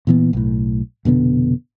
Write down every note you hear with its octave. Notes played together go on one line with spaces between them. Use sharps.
A#2 E3 B3
B1 A2
F1 B2 D3 B3